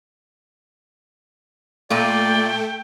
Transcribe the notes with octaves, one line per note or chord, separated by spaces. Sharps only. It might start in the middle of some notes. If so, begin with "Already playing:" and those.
A#2 A3 F4 D5 G5